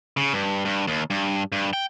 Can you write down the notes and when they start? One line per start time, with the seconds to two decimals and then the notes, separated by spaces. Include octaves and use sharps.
0.17 C#3
0.33 G2
0.65 G2
0.87 D#2
1.10 G2
1.52 G2
1.73 G5